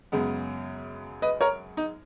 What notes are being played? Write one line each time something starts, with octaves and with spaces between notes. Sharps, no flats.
F#2 C#3 G#3 B3
B4 D#5
A#4 C#5
D#4